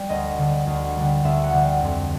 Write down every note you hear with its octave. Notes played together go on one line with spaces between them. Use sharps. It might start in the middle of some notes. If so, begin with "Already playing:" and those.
Already playing: G3
D2 D#5
D3 G3
D2
D3 G3
D2 E5
F#5
D3 G3
F5
F2